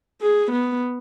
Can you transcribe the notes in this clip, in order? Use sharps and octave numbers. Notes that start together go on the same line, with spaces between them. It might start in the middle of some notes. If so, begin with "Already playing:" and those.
G#4
B3